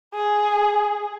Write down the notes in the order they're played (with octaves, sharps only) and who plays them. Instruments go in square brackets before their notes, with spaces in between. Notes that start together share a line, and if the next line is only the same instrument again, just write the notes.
[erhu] G#4